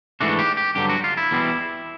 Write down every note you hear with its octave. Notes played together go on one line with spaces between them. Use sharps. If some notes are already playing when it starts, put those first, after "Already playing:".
G#2 E3 A3 D4 F#4
G4
G4
G2 D3 F#3 G4
F#4
F4
E4
E2 B2 G3 C4